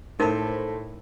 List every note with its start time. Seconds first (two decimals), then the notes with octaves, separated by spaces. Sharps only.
0.20 A2 D#4 A4 A#4 C5